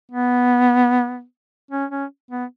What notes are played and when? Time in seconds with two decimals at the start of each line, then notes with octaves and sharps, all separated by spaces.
0.11 B3
1.71 C#4
1.91 C#4
2.31 B3